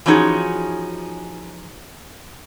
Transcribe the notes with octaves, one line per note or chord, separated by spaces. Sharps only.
E3 F3 C#4 D#4 F#4 G#4